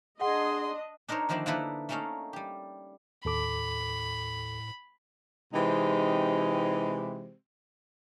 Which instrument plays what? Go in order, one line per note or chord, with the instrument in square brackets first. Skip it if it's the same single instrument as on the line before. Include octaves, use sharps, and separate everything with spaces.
[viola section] D4 D#5 [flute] G#4 [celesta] F#5 [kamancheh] C6
[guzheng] D4 D#4 A#4 C5 C#5
D3 D#3 F3 A#3 D4 E4
D3 A#3 D#4 E4 A4 B4
A3 A#3 C#4 D#4 A4 F5
G3 G4
[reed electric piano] D#2 A4 D6 [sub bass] A2 [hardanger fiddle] B5
[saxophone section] C3 E3 G#3 C4 D#4 G4